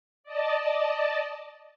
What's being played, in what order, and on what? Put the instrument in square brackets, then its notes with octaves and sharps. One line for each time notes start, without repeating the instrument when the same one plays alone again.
[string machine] D5 D#5 A5